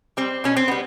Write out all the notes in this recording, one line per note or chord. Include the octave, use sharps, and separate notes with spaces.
G3 C4
B2 C#4
C4
G3 B3